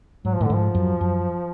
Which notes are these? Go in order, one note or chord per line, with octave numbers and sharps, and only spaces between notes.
G#2 F#3
F3
A2 D3
G#2 F3
F#2
F#2